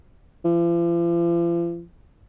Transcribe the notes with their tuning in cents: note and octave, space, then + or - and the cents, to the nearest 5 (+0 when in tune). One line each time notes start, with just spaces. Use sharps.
F3 -45